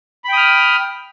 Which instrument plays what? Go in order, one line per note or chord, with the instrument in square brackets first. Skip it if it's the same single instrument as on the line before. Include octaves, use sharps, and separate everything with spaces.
[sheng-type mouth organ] B5
G5
D#6
F6